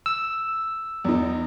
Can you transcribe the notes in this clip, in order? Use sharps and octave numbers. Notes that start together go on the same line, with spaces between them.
E6
E2 D#4